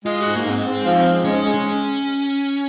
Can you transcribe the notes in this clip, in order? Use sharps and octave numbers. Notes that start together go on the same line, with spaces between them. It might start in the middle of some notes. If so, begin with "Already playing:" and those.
G#3 F4
G#2 F#4
A#3
G#2 C4
G#2
F3
G#2
G#3 C#4
G#3
C#4